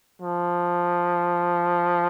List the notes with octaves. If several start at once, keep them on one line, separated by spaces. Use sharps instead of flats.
F3